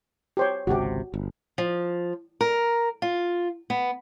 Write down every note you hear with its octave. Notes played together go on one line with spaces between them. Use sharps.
G4 C5 C#5
G#1 C#2 C3 F#4 G4
G1
F3
A#4
F4
B3